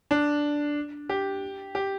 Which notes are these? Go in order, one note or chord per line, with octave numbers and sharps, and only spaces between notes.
D4
G4
G4